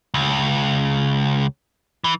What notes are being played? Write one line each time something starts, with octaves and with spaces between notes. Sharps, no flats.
C#2
E3